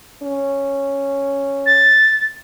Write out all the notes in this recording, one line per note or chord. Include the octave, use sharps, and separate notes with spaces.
C#4
A6